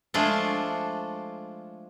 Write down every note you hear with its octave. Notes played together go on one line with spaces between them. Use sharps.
F3 G#3 A3 D4 F4 A4